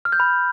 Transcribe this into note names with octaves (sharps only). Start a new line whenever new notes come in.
F6
G6
B5